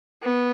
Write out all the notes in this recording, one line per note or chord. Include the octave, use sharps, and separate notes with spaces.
B3